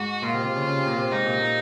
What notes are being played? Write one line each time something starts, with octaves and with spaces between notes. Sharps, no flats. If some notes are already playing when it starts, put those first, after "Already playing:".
Already playing: G#2 F#4
A#2 F4
C3
C3
C#3
C#3
C3
A#2
C3
G#2 D#4
A#2
A#2